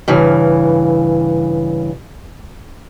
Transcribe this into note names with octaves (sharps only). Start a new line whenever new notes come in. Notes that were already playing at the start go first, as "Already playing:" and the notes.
G2 C#3 E3